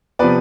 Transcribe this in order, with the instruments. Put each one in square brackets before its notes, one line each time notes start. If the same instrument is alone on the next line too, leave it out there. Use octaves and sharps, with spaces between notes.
[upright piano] C3 F3 B3 B4 D5